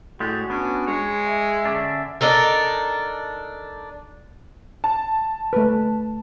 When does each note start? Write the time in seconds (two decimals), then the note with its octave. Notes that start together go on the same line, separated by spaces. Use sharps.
0.20 A2 G#3 D4 F#4 G4
0.50 B3 C#4 D4
0.87 G#3 C#5
1.27 E5
1.65 D3 C#4 D4
2.21 D4 D#4 A4 A#4
4.84 A5
5.53 A3 B4